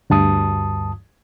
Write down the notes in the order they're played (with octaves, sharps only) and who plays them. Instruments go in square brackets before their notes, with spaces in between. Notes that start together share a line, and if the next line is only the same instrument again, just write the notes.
[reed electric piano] D2 G2 A5 D#6